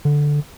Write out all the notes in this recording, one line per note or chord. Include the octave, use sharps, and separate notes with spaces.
D3